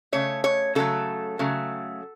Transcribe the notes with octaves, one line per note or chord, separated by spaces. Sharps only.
C#3 A3 C#5
C#5
C#3 F#3 A3 A4
C#3 F#3 A3